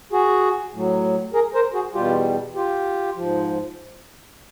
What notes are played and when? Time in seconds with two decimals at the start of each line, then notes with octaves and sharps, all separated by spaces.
0.12 F#4 G#4
0.73 A2 F#3
1.33 G#4 A#4
1.54 A#4 C5
1.74 F#4 G#4
1.94 E2 B2 G3 F4 G4
2.55 F4 G4
3.16 G#2 F3